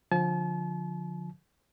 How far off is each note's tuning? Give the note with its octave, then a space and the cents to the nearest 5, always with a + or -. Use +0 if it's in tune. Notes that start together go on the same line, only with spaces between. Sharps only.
D3 +0 F3 +20 A5 -40